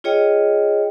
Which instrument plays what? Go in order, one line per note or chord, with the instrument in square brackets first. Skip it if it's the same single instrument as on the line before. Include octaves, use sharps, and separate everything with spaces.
[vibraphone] F4 G#4 C#5 D#5 G5